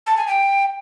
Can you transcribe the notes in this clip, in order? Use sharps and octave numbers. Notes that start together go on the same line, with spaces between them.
A5
G#5
G5